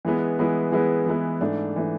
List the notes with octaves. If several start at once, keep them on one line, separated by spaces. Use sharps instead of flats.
E3 G#3 B3 E4
E3 G#3 B3 E4
E3 G#3 B3 E4
E3 G#3 B3 E4
G#2 E3 A3 D4
E3 A3 D4